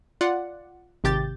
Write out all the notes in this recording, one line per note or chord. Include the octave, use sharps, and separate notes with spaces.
F4 D5 F#5
G#1 C3 G4 G6 A6